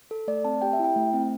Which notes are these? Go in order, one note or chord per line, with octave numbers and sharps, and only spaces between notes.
A4
A3 D5
C4 A5
G4 G5
E5
E4 G5
A3
C4